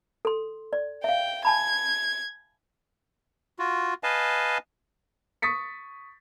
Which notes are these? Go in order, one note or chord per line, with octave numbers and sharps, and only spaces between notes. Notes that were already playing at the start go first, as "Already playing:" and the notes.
A4 C6
D5
E5 F5 G5
G#5 A5 B5 G#6
F4 F#4
B4 D#5 F5 G#5 A5
C#6 D#6 A6 B6 C#7